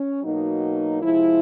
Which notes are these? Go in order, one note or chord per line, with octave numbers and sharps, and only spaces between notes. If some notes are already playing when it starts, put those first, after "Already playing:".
Already playing: C#4
B2 F#3 A#3 D#4
C3 F3 G#3 E4